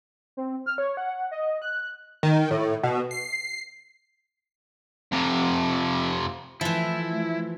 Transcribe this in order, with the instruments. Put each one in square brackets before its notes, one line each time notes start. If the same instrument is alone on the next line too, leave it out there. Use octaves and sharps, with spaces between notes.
[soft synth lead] C4
F6
C#5
F#5
D#5
F#6
[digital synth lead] D#3
A2
B2
C7
[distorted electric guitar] F2 C3
[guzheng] E3 F3 [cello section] A3 [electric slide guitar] E4